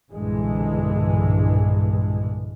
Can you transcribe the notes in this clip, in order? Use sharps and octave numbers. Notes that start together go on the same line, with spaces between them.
B1 G2 A#2 D3 E3 G#3